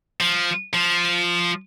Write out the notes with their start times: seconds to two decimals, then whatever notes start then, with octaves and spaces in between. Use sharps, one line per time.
0.21 F3
0.74 F3